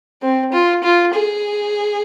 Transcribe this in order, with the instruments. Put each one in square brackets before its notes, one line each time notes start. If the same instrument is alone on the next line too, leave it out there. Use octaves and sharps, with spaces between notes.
[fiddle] C4
F4
F4
G#4